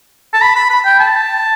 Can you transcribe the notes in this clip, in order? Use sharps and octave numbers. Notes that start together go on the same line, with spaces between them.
A5
B5
B5
B5
G5
A5